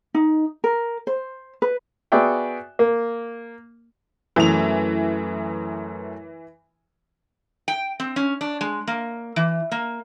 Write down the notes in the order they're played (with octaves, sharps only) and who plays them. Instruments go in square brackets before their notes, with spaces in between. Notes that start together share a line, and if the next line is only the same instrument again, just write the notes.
[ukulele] D#4
A#4
C5
B4
[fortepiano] B3 F#4 G#4 D5 E5 G5
A#3
[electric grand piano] F#2 A3 [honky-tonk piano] E3 F7
[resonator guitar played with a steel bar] G5
C4
C#4
D4
G#3
A#3
E3
A#3